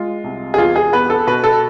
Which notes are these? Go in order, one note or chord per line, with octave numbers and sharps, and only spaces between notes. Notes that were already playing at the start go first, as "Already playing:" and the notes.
Already playing: G#3 F4
C2
G#4
E2 F4
G#4
B3 B4
A4
B2 B4
A4